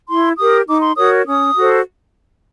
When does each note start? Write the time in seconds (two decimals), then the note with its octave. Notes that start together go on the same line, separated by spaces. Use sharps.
0.08 E4 C6
0.38 G4 A#4 D#6
0.67 D#4 D6
0.82 C6
0.97 F#4 A#4 C#5 D#6
1.26 C#4 D#6
1.56 F#4 A4 C5